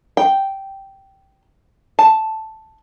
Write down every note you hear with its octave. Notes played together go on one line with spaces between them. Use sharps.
G5
A5